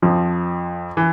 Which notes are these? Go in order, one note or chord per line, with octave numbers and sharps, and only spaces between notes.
F2 F3
E3